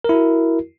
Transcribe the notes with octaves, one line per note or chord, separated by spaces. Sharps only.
E4 F#4 A#4